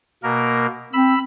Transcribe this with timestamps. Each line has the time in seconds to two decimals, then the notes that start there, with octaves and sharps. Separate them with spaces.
0.23 B2 A#3 A#4
0.93 C4 B5 E6